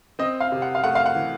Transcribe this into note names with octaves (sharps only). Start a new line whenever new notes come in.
C4 D#5
F5
C3
F#5
F5
A3 F#5
F5
F#5
E3